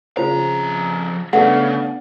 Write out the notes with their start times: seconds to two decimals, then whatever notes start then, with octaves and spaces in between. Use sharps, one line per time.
0.17 F2 C#3 F4 C5 A#5
1.33 C#3 A3 B3 D4 F#5